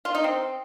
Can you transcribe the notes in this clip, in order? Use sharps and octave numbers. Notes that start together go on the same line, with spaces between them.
F4
D#4
C4